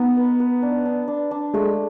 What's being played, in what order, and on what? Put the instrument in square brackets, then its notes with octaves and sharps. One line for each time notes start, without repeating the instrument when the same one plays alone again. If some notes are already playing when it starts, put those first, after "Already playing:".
Already playing: [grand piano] B3 [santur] D#4
[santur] B4
B4
D4
D4
D4
D4
[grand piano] G#3 [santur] A3